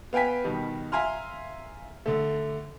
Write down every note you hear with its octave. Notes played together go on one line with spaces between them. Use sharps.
B3 F5 G5 G#5 B6
B2 D#3 G3
E5 F5 G#5 A#5 C6 F6
D3 A3